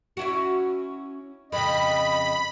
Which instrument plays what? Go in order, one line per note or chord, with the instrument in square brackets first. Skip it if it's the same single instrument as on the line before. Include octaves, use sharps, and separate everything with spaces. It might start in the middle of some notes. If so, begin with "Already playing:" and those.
[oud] C#4 E4 F#4
[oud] F2 C#3 [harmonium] D#5 [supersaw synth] B5